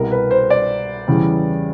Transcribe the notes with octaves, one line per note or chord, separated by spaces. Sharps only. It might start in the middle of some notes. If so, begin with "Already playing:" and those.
Already playing: C2 B2 G3 A#4
B4
C5
D5
E2 C#3 E3 G3